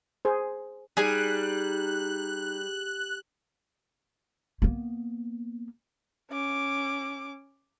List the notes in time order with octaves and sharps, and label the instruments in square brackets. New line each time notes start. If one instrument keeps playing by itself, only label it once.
[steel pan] G#4 C5
[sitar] G3 [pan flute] D#4 [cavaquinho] G#4 G#5 [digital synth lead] F#6
[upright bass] A#3 B3
[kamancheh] C#4 D6